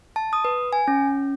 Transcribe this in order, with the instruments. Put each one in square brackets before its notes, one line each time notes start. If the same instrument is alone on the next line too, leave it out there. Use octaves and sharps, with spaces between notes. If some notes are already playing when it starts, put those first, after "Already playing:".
[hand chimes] A5
D#6
B4
G#5
C#4